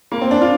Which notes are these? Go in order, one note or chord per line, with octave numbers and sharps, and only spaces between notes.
A#3
C4
D4
F4